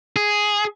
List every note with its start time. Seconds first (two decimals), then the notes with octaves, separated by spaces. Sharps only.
0.16 G#4